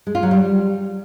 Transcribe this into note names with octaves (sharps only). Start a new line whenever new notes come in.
G#3
F4
F#3
G3